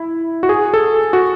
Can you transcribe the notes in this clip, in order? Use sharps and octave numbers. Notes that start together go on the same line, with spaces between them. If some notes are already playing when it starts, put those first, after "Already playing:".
Already playing: E4
F#4
G#4
A4
F#4